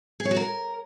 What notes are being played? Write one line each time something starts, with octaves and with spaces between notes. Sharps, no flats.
G#4
C#5
F#4
A#4